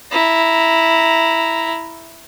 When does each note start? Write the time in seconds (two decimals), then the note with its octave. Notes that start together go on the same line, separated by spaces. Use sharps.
0.12 E4 A#5